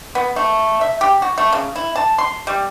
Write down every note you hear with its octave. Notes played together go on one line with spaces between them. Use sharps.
B3
A3
E5
G4
F#4
A3
C#3
E4
A5
C6
G3